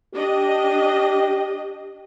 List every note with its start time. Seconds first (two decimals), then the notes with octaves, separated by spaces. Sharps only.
0.15 D4 G4 D#5